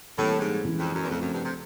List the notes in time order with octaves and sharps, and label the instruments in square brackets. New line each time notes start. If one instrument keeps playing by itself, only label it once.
[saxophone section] A2 [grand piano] C3 E3 G3 A#3
[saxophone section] G#2
[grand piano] E3 G#3 C#4
[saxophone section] F2
F#2
E2
[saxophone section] F2 [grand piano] C#3 F3 A3 C4
[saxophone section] F#2
G2
C3